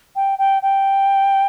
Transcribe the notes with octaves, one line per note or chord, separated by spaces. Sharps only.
G5
G5
G5